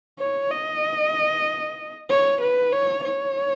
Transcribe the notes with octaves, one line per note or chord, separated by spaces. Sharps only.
C#5
D#5
C#5
B4
C#5
C#5